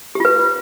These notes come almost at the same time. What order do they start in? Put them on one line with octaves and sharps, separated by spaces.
G4 F4 B4